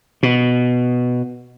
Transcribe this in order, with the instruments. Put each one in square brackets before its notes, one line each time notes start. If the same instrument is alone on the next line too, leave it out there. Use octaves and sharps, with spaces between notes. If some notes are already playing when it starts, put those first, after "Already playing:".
[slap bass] B2